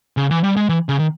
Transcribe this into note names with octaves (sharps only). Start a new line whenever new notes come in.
C#3
E3
G3
G#3
E3
C#3
D#3